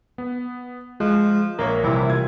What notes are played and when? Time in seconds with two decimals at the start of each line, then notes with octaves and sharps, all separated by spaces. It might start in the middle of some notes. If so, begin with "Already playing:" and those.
0.18 B3
1.00 F3 G#3 F#6
1.59 A#1 A#3 A#4 C#5
1.84 C3 E3 G3 E4
2.09 A3 F4 G#6